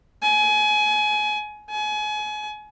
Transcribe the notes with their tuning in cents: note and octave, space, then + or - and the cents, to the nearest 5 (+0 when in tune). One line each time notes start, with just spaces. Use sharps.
G#5 +25
G#5 +30